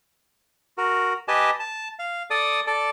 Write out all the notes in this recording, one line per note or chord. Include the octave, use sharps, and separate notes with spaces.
F#4 A#4
G4 B4 D#5 G#5 A5
A5
F5
A4 D5 A5 D#6
A4 D5 A5